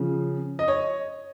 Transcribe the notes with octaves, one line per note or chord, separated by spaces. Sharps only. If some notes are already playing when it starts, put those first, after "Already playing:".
Already playing: C#3 F3
D#5
C#5